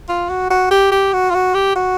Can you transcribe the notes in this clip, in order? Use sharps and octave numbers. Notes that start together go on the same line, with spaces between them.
F4
F#4
F#4
G4
G4
F#4
F4
F#4
G4
F#4